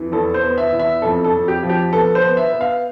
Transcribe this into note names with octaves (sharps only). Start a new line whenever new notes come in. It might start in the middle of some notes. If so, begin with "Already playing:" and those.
Already playing: F2 E3
E2 A4
C5
B3
E5
E2
E5
F2 A4
A4
F2
G4
F3
G4
B3 A4
C5
B3
E5
B3
F5